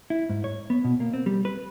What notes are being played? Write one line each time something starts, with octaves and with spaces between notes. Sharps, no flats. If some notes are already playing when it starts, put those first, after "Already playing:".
E4
G#2
C#5
B3
B2
A#3
C4
G3
B4